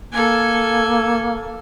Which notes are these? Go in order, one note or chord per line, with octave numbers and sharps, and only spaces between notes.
A#3 A4 G#5